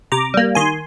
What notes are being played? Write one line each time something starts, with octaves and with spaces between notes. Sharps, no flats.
C3 A#5 D6
G3 A#3
D#3 G#5 C6